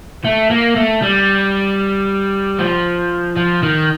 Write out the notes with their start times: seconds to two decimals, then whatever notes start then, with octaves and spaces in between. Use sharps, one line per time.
0.25 A3
0.51 A#3
0.76 A3
1.03 G3
2.59 F3
3.36 F3
3.63 D#3